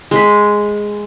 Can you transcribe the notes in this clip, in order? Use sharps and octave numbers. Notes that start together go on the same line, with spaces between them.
G#3 B5